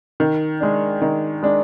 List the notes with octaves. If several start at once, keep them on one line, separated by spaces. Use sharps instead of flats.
D#3
G#3 D4
D#3
G#3 D4